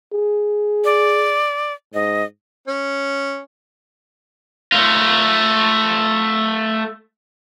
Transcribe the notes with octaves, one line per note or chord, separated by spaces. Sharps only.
G#4
D5
G#2 D#5
C#4
A3 F4